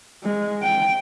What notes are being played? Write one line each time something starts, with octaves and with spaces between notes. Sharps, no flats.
G#3
G5